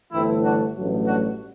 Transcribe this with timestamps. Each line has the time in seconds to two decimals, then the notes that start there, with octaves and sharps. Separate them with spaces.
0.12 G1 G2 E3 A3 C4 E4
0.43 D4 F#4
0.75 A1 G2 F#3 A3
1.06 D4 F#4